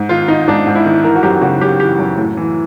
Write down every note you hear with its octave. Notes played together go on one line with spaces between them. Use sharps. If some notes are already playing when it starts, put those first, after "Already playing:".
Already playing: G#2
D#3 F4
D#3 D#4
G#2 D4
G#2
E4
D#3
E3 A#4
F#4
F#2 G4
C#3 F#4
F#2 G4
E3 G4
F#2
A2
E3